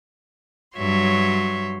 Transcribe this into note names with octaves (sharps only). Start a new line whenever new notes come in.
G2 F#3 C#5 E5 C6